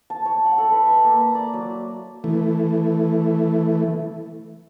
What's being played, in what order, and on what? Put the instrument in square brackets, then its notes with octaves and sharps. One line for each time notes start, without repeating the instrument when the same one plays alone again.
[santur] A5
C#5
F#5
A4
B4
E5
A#3
A#5
D5
F#3
[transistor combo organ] E3 A3